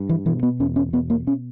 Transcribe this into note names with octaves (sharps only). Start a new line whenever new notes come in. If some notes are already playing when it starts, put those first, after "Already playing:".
Already playing: G2
E3
B2 E3
B3
E2 C#4
C#4
B2 B3
A#3
C#4